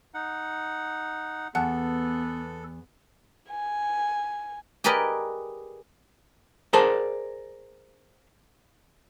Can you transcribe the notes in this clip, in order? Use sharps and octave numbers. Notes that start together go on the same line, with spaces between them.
D#4 F#5
E2 B3 A4 F#5 A5 F#6
G#5
G4 G#4 A#4 B4 D5 D#5
G#4 A#4 C5 D5 F#5 A5